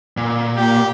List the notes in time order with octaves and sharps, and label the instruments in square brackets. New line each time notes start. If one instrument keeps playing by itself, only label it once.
[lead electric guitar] A#2
[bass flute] A#3 [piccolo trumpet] G4